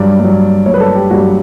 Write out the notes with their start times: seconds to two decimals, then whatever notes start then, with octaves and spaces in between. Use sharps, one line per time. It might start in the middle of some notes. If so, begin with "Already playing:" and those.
Already playing: G2 F#3 D5
0.20 G2 F#3
0.66 G2 F#3 C#5
0.74 B4
0.80 A4
0.95 G4
1.11 G2 F#3 F#4